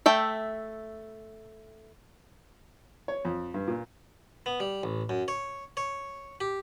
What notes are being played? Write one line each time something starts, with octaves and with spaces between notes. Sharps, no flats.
A3 E5 G5
C#5
F2
G2
A#2
B3
G3
A1
F#2
C#5
C#5
G4